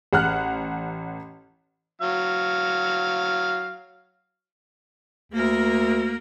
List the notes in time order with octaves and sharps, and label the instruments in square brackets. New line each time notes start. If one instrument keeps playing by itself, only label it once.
[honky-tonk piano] A1 F#5 F6 F#6
[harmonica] F#3 F5
[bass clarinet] D2 [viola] A#3 A#4